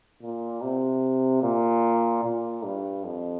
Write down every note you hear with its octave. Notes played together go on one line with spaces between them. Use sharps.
A#2
C3
A#2
A#2
G2
F2